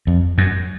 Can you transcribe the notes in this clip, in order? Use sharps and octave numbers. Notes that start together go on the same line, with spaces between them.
F2
F#2